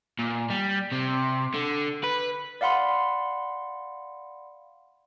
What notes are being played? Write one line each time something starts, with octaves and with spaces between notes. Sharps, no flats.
A#2
G3
C3
D3
B4
D5 F5 F#5 B5 C6